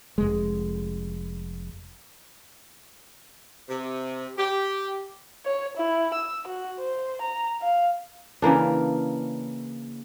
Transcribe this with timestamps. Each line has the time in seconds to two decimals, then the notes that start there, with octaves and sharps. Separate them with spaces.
0.18 F1 G#3
3.69 C3
4.37 G4
5.45 C#5
5.77 E4
6.14 E6
6.48 F#4
6.79 C5
7.22 A#5
7.62 F5
8.42 C#3 E3 A#3 D4